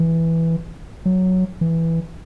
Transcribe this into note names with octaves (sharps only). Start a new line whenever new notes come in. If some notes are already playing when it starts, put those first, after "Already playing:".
Already playing: E3
F#3
E3